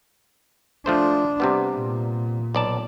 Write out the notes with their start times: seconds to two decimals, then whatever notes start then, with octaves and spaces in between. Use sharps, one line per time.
0.86 F3 A3 D4 C5
1.40 C3 G3 B3
1.74 A#2
2.55 B1 D5 A5